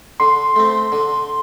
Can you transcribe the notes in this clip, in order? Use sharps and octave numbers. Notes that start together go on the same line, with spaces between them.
D3 C6
A3 C4
D3